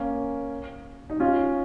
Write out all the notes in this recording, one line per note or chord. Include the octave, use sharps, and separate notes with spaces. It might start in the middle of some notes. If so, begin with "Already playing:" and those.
Already playing: A#3 C#4
D#4
C#4 F4